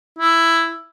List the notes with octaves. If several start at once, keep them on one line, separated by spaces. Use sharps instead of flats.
E4